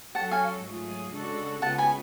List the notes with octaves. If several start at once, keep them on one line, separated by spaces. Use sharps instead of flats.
F#3 C#4 F#4 A4 F#5 A5
F5 G#5
G#2 F#3 A3 F4 G#4
C#3 G#3 D4 F#4 A4
C#3 G#3 B3 F4 F#5 A5
G#5 B5